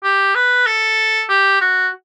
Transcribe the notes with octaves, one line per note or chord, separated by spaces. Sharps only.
G4
B4
A4
G4
F#4